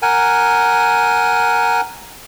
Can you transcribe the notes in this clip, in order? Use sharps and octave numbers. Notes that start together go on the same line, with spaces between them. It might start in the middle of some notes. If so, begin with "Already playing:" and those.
A#4 F#5 G#5